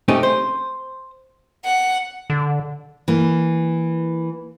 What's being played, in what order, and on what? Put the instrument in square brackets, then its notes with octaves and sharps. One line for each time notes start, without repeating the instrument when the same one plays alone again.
[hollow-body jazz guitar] A3 C4 C#4 D#4 G4
C5
[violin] F#5
[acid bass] D3
[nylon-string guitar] E3 A#3